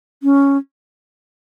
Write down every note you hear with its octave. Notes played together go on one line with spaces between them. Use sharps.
C#4